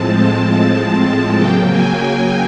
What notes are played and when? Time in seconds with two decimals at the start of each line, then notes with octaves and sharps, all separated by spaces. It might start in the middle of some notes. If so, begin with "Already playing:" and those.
Already playing: A2 F3 G#3 C4 A5
1.36 C#3 F#3 A#3 G5
1.70 G#5
2.05 G#5